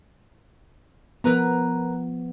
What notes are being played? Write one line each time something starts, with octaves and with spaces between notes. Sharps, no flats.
F3 B3 A#4 B4 A#5